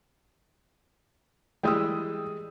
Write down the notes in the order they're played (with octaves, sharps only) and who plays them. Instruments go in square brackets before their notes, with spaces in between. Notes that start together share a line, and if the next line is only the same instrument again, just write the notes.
[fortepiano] E3 G3 G#3 [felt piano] G5 D#6 E6